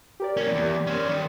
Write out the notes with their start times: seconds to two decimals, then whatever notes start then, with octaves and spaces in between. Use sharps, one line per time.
0.20 G4 A#4 D5
0.37 A#3 C#4
0.51 E2
0.87 C#4 C5
1.09 D#3 G3